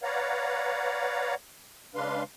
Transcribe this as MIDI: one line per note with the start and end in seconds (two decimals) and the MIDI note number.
0.03 1.35 71
0.03 1.35 73
0.03 1.35 74
0.03 1.35 77
0.03 1.35 78
0.03 1.35 82
1.95 2.23 49
1.95 2.23 56
1.95 2.23 62
1.95 2.23 71
1.95 2.23 77
1.95 2.23 84